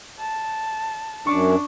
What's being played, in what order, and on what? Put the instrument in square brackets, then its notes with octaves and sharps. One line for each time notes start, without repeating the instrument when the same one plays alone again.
[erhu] A5
[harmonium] F#2 [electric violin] D4 [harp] C#6 D6